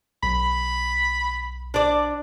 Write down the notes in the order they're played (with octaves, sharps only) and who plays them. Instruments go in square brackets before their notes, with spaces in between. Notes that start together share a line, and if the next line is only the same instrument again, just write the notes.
[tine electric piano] B1 [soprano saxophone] B5
[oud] D4 D5